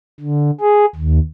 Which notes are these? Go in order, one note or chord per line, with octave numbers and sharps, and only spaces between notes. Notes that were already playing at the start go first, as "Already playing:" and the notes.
D3
G#4
D#2